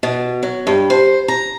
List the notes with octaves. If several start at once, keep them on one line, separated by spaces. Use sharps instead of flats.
B2
F#3
G2
C5
A#5